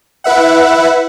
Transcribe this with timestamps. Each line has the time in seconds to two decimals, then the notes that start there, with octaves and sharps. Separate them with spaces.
0.24 E4 B4 E5 F#5